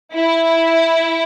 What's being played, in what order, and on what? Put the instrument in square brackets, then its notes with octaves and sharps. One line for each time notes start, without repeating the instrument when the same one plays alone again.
[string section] E4